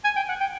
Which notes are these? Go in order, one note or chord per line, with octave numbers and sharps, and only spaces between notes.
G#5
G5
F#5
G5